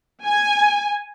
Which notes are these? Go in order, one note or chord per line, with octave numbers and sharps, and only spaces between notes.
G#5